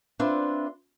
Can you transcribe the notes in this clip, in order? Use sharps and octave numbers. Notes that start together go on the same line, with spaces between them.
C4 D4 F4 B4 D5 E5